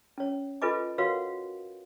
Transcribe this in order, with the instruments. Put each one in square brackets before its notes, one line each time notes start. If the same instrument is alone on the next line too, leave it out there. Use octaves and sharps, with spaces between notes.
[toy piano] C#4 C#5
F4 A4 B4 D#5 G#5 D6
F#4 A#4 B4 C#5 F5 F#5